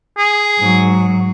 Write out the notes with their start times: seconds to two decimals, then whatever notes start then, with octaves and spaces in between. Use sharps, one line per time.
0.18 G#4
0.59 G#2 F#3